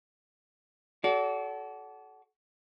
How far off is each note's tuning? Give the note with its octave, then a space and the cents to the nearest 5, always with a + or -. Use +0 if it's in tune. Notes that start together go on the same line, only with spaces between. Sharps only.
F#4 +15 A4 -30 D5 -35